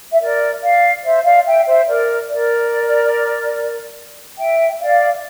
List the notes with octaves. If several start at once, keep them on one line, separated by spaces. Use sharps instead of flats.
E5
A#4 D5
D5 F5
C5 E5
D5 F5
E5 G5
C5 E5
A#4 D5
A#4 D5
E5 G5
D5 F5